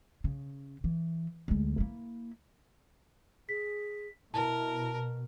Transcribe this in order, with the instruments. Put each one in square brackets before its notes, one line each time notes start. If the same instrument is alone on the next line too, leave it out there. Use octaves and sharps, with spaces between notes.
[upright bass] C#3
E3
D2 G#3
A#3 E4
[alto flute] G#4 [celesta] B6
[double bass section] B2 [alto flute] E4 [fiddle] A#4 [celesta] A5